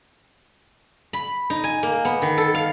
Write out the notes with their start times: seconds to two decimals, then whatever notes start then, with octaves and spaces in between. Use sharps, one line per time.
1.13 B5
1.50 D#4
1.64 G#5
1.83 A#3
2.05 B3
2.22 D#3
2.38 A4
2.55 F5